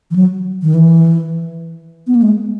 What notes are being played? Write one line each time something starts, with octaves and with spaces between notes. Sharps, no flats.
E3
F#3
D#3
E3
B3
A#3
G#3